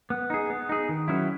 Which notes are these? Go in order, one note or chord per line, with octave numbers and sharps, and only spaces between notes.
B3
D#4 G#4
B3
D#4 G#4
D#3
F#3 C#4 E4